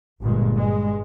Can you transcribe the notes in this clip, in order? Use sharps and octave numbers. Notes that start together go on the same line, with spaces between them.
G1 G2 A#2 G#3
G2 G#3